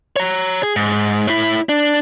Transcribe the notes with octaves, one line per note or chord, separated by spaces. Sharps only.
C#5 A#5
G#4
G#2
A2 E4
D4